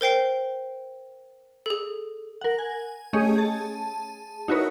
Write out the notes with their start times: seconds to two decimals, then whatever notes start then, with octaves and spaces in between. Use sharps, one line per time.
0.01 A#4 C5 G5 C7
1.66 G#4 A4
2.41 A#4 F#5
2.59 G#5
3.13 A3 C#4 G4 G#4 C#5 D#5
3.36 G#4 A5
4.48 D#4 E4 F#4 A#4 B4 C#5